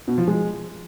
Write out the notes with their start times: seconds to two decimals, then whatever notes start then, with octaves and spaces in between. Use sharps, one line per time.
0.08 B2
0.18 F3
0.28 G#3